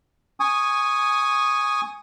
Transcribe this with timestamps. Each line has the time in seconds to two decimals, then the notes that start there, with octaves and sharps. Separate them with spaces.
0.40 G#5 C#6 D#6